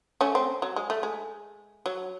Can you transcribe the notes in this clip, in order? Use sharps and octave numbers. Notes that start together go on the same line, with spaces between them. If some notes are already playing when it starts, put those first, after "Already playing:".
A3 C#4
C4
F#3
G#3
A3
G#3
F#3